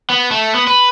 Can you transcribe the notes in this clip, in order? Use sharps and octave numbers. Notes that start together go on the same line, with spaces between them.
B3
A3
B3
B4